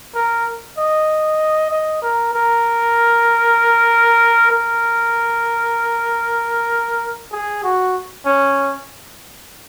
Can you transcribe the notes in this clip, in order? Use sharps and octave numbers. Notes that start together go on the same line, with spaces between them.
A#4
D#5
D#5
A#4
A#4
A#4
G#4
F#4
C#4